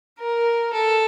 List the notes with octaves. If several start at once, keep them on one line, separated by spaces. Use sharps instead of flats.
A#4
A4